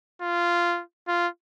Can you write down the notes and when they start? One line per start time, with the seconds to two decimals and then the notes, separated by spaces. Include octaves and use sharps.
0.22 F4
1.08 F4